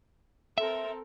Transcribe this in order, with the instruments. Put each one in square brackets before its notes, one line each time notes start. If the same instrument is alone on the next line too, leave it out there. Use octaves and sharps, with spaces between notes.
[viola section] C4 A4 A#4 [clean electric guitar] E5